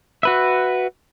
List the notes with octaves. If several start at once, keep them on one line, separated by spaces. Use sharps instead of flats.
F#4 B4 E5